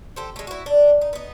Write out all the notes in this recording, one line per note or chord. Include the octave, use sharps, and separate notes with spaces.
G4 A4 C5
G#3 A3
E4 F#4
D4
D#4
B3 D#4